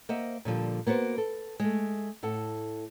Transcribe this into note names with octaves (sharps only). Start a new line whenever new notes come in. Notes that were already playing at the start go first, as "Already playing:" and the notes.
A#3 C5 D#5 E5 F#5
A#2 D3 F3 G3
A#3 B3 E4 F#4 C5
A4
G#3 A3
A2 A4 F#5 A5